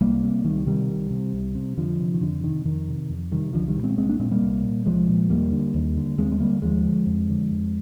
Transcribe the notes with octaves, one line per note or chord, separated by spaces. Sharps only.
C2 G3 A#3
C3
C2 D#3 G3
C3 D#3 G3
C2
C3
C2
C3
F2 D3 F3
C3
D#3
F2 D3
C3 D#3
F2 D#3
C3
F2
C3 D#3 G3
C2 D3 F3
D#3 G3
A#2
G#3 C4
C2 G#3 C4
A#3 D4
A#2 G#3 C4
G3 A#3
C2
A#2
C2 F3 G#3
A#2
D#2 G3 A#3
D3
D#2
D3
D#2 G#3 C4
G#3
D3 G3 A#3
D#2 F3 G#3
D3
F2
D3
F2